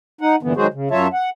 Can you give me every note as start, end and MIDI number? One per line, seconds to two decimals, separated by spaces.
0.21 0.36 63
0.21 0.36 78
0.43 0.53 43
0.43 0.53 46
0.43 0.53 50
0.43 0.53 52
0.43 0.53 59
0.57 0.67 51
0.57 0.67 54
0.57 0.67 56
0.57 0.67 66
0.57 0.67 68
0.57 0.67 72
0.74 0.89 49
0.91 1.07 42
0.91 1.07 54
0.91 1.07 65
0.91 1.07 73
0.91 1.07 76
0.91 1.07 81
1.13 1.30 78